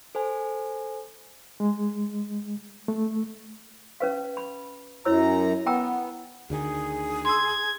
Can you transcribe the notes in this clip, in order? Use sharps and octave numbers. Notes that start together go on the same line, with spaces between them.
A4 C5 G#5
G#3
A3
C#4 B4 F5
B5
F#2 E4 C#5 A#5 E6
B3 G5 A#5 E6
D2 D3 D#3 G#4
C6 E6 G#6